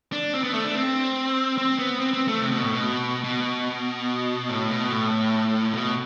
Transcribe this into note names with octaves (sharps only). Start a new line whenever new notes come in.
D4
C4
B3
A3
D4
C4
C4
B3
C4
C4
A3
C3
B2
A2
B2
B2
A2
B2
A2
B2